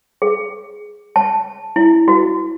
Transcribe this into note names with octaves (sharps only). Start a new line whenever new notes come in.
G#4
A5
E4
F#4